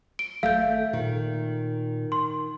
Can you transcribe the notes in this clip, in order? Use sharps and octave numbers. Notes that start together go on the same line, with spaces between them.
D7
G#1 A3 F5 G6
A#2 D#3
C6